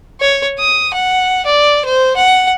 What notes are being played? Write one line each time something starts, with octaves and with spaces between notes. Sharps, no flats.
C#5
D#6
F#5
D5
C5
F#5